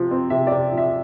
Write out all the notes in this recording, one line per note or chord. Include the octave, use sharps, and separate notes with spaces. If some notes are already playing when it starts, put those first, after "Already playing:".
Already playing: C3 F3
C4
C3 E5
C3 D5
F3
E5